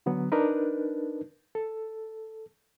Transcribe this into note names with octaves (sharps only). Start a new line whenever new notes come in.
D3 F#3 B3
D4 D#4 A#4 B4
A4